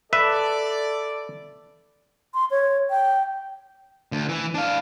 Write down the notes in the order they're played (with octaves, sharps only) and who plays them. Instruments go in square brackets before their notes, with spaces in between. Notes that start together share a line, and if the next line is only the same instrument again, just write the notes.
[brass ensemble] A4 D5 [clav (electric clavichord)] B4 E5
[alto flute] C6
C#5
G5
[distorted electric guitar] D2
E3
D4 F5